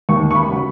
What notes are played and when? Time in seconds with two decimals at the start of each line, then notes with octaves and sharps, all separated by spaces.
0.09 D#2 C#6
0.31 C#6
0.35 B5
0.49 C#3 F#3